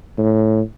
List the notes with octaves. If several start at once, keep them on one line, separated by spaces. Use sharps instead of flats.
A2